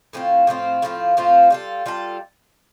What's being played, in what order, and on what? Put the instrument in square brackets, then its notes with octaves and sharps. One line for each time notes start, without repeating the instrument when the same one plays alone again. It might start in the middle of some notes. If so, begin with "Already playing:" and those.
[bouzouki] A2 F3 C4 F4
A2 F3 C4 F4
A2 F3 C4 F4
A2 F3 C4 F4
G3 F4 A4
G3 F4 A4